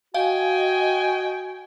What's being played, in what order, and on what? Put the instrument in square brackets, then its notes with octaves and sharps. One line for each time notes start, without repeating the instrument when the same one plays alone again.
[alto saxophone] F#4 [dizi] D#5 [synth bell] F5 [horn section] G5 G#5